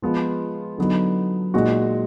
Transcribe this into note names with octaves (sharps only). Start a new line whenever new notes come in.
F3 G#3 B3 F4
D3 F#3 B3 D#4
A#2 G#3 D#4 F#4